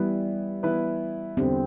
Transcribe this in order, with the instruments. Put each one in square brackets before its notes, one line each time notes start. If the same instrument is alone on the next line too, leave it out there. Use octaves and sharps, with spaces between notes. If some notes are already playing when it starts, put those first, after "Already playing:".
Already playing: [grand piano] E3 B3 E4 B4 [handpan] G3
[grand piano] E3 B3 E4 B4
[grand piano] E2 D3 G3 [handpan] C4